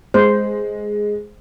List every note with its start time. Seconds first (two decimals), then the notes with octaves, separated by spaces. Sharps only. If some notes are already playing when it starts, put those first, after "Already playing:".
0.14 G#3 C5